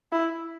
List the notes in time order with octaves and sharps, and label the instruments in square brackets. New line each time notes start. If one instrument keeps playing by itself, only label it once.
[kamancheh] E4